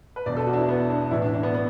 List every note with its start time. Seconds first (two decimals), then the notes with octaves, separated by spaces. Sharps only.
0.16 B4
0.26 E1 E2 B2 D5
0.36 A4
0.47 F#4
0.53 D4
0.58 E4
0.69 B3
0.90 D4
1.11 A1 A2 E3 E4
1.22 D4
1.33 D4
1.43 B3
1.55 B3